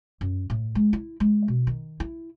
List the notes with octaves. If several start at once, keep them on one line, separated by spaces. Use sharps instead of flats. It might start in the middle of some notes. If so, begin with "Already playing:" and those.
F#2
A2
G#3
E4
G#3
B2
D#3
E4